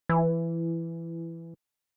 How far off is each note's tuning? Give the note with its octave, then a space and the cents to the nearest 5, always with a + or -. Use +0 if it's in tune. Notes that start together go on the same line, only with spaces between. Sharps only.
E3 +15